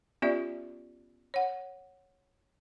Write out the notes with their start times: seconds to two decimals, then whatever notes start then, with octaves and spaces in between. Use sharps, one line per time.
0.22 B3 C#4 F4 G4 D5 E5
1.34 C#5 F#5